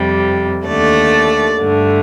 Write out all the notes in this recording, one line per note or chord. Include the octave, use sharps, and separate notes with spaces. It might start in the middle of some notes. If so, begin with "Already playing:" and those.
Already playing: F2 C3 G3
D#2 D3 A3 D5
G2 D3 A3